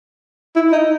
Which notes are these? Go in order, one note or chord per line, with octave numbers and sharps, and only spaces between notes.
E4
D#4